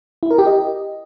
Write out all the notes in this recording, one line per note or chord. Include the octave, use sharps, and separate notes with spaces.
E4
A#4
G4
D#5